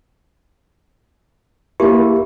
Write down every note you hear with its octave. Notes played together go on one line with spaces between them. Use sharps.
A#3 E4 G4 G#4